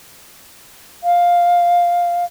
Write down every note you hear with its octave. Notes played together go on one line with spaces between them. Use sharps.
F5